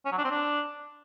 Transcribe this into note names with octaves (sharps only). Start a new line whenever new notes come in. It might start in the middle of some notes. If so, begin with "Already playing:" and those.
C#4
F#3
D4
C4
D4